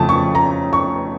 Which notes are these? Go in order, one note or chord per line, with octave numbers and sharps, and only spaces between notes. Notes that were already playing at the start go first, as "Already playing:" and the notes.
Already playing: F2 C#3 F3 A3 A5
C#6
A#5
C#6